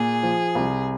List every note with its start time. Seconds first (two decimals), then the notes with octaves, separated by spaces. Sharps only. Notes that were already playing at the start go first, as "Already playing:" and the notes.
Already playing: A#2 G#4
0.23 F3
0.55 C2